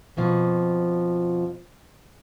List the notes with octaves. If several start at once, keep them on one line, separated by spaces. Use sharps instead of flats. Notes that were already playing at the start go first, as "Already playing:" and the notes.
F2 B2 F3